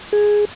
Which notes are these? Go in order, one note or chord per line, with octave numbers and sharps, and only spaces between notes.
G#4